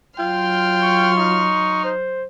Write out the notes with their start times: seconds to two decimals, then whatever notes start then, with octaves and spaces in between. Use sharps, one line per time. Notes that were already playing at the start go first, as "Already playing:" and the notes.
0.19 F#3 F4 G5 C6 F6
0.82 C#6
1.17 D#4
1.84 C5